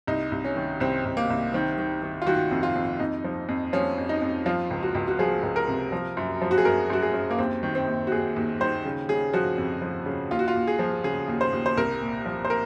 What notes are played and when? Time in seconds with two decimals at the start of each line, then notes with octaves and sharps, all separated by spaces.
0.07 C2 D#4
0.32 C2
0.45 C#4
0.56 D#3
0.80 C2 C4
1.05 C2
1.17 A#3
1.30 C2
1.53 D#3 C4
1.78 D#3
2.03 D#3
2.22 F4
2.27 D#3 F#4
2.51 F2
2.63 F4
2.76 F2
3.00 F2 D#4
3.24 F3
3.49 F2
3.73 F3 C#4
3.98 F2
4.09 D#4
4.22 F2
4.46 F3 F4
4.71 C#2
4.83 F#4
4.95 C#2
5.08 F#4
5.19 F3 G#4
5.43 C#2
5.56 A#4
5.68 C3
5.92 F3
6.17 F#2
6.42 F3
6.51 F#4
6.58 G#4
6.65 F#2 A#4
6.90 F#2 F#4
7.02 G#4
7.14 F#2
7.31 A#3
7.38 D#2 C4
7.63 D#3
7.75 C4
7.88 D#2
8.07 F#4
8.11 D#2 G#4
8.36 D#2
8.60 D#3 C5
8.85 C#3
9.09 C#3 G#4
9.34 F3 F#4
9.58 F2
9.82 F3
10.06 C#3
10.31 D#2 F4
10.39 F#4
10.48 F4
10.55 D#2
10.67 G#4
10.79 F3
11.04 C#3 G#4
11.28 D#2
11.41 C5
11.53 D#2
11.66 C5
11.77 C2 A#4
12.01 A#2
12.26 F3
12.45 C5
12.50 A#4